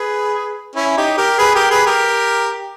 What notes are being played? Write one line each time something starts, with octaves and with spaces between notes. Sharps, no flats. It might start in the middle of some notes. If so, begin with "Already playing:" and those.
Already playing: G#4 B4
C#4 E4
D#4 G4
G4 A#4
G#4 B4
G4 A#4
G#4 B4
G4 A#4